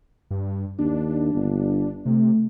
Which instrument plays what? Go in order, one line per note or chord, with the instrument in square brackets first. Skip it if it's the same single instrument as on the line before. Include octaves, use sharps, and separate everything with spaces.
[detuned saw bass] G2
[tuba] D#2 [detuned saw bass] D4
[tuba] G1
[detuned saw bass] C3 [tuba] A3